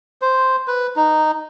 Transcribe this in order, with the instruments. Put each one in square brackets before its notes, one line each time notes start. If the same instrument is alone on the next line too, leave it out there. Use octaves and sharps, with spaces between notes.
[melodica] C5
B4
D#4